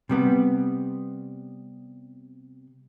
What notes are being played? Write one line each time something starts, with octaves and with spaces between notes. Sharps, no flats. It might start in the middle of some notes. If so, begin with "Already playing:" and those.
C3 G3 B3